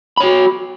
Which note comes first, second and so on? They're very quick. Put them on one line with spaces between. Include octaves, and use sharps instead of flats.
B5 C#5 F#4